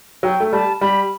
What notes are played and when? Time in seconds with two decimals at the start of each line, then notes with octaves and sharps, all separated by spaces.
0.23 F#3 G5
0.40 A3
0.53 G3 A5
0.81 G3 B5